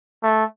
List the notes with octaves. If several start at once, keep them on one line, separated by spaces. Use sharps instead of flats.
A3